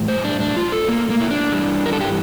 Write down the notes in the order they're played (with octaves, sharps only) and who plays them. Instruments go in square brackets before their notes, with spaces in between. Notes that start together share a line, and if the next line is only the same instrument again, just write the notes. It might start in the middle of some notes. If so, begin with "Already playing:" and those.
Already playing: [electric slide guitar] A2 E3 G3
C5
D4
D4
F4
A4
A#3
A#3
E4
D4
G2 E3 G3
A#4
A4
G4